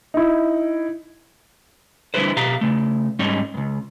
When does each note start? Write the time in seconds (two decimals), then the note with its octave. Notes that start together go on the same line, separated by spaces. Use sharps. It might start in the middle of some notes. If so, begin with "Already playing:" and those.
0.14 D#4 E4
2.14 D3 G3 E4 F#4 B4 C5
2.36 B2 G4 F5 A#5
2.61 C#3 A3
3.19 G#2 G3 C#4 D#4 C#5
3.54 C#2 G2